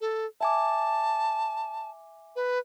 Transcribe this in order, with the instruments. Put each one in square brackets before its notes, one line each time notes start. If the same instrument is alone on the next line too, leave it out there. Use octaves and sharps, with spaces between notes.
[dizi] A4
[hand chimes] E5 G#5 D6 [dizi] A5
[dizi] B4